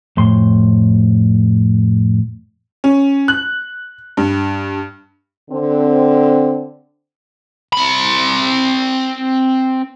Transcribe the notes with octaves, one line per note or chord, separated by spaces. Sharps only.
F2 A2 C6
C#4
F#6
G2
D3 C4
C4 B5